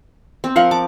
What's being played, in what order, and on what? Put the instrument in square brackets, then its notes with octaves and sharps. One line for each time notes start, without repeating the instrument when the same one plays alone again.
[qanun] C4
[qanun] F3 A#4 F#5 [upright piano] F5
[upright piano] A5 [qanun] D6